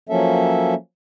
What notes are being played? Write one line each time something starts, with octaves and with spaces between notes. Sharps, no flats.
F3 F#3 A#3 C#4 A4 E5